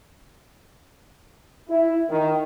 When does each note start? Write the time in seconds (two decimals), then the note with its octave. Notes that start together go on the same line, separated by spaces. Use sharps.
1.70 E4
2.09 D#3